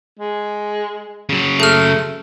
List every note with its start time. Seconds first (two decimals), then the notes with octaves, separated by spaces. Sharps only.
0.19 G#3
1.29 C#3 F#3
1.60 A3 G#4 F6